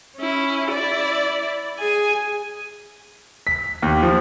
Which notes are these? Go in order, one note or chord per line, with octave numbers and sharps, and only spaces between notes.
C#4 E4
E4 D5
G#4 G#5
B6
D#2
F3